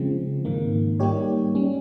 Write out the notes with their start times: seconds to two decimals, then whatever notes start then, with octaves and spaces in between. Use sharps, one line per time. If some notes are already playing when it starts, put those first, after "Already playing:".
Already playing: C#3 F3 G#3 C4
0.45 G#2 D#3 A#3
1.00 G3 A#3 D#4 G4 C#5
1.55 G3 C#4